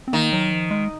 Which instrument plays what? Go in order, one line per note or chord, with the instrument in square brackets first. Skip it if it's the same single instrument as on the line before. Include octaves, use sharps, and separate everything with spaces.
[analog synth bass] C4
[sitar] D#3 [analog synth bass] A#3
[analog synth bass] F#3
F3
G#3